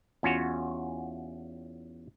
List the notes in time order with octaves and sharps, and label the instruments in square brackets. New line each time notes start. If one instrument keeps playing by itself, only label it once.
[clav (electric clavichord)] E2 C#4 F4 F#4 C#5